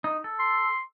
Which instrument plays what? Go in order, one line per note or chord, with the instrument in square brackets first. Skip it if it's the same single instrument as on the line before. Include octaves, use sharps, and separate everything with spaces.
[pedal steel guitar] D#4
A4
[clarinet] C6